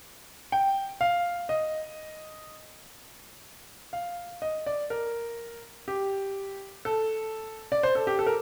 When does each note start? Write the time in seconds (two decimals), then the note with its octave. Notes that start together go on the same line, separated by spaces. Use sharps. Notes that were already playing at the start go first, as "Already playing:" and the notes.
0.52 G5
1.01 F5
1.49 D#5
3.93 F5
4.42 D#5
4.66 D5
4.90 A#4
5.88 G4
6.85 A4
7.72 D5
7.83 C5
7.95 A4
8.07 G4
8.19 A4
8.26 A#4